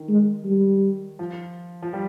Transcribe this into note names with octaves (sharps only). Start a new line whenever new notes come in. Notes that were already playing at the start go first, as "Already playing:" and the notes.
Already playing: D#3
G#3
G3
F3
F3
G3